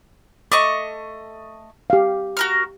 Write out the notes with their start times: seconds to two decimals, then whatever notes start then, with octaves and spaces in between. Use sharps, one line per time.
0.52 A3 D#5 C#6 D6
1.90 G4 F5
2.37 F#4 A#4 F6